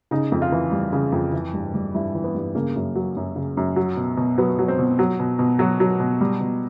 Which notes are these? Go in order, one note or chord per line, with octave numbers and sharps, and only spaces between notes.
C#3 D#4
F2
F4
E3
G3
C#3
F2
E3
G2
G3
G2 E4
E3
B3
G2
C#3 A#3
F#2
F#3
F#2
C#3
F#2
F#3
B2
B2
F#3 B3
F#3
C4
B2
F#3
B2
B2
F#3 F#4
F#3
B2
G3
B2